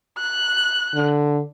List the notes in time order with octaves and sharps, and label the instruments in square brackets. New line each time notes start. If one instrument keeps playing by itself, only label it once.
[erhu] F#6
[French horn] D3